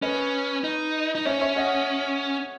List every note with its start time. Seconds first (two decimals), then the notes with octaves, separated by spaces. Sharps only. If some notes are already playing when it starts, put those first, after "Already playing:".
0.02 C#4 B4 D#5
0.64 D#4
1.15 D#4
1.25 C#4 C#5 E5
1.41 C#5 E5
1.56 D#5 F#5